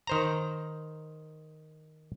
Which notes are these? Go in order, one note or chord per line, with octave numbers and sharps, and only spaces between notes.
D#3 C5 A#5